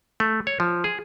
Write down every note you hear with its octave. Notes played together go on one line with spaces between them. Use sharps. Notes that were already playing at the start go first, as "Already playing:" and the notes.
A3
C#5
F3
G#4